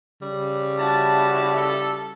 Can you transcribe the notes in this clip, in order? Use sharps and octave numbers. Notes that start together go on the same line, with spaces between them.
C#3 G3
E4 F#4 A5
A4